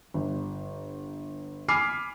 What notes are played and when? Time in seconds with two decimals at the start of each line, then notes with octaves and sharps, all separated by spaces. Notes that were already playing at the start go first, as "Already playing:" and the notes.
0.14 G1
1.68 G#5 B5 D6 F6 C7